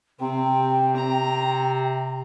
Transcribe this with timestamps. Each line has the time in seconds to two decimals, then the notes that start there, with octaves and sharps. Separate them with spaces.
0.20 C3 C4 G5
0.97 A#5